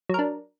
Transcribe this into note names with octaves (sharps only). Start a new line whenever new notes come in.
F#3 D4 A#4